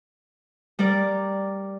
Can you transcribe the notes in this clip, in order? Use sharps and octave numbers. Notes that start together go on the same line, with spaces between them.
G3 A#4 D5